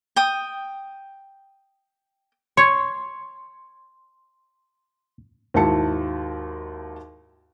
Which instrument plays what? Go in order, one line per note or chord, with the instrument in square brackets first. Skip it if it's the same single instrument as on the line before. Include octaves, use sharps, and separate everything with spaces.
[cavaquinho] G5 D#6
[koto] C#5 [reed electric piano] C6
[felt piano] D#2 G#2 E4 F#4 A5 C#7